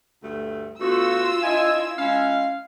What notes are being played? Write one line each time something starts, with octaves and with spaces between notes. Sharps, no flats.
D2 G2 A3
D3 A3 B3 F4 F#4 E6
D4 E4 D#5 G#5
G#3 C#4 E4 F5